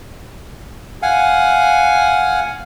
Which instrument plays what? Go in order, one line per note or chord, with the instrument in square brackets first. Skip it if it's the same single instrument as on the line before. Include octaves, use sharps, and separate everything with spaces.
[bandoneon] F5 F#5 G#5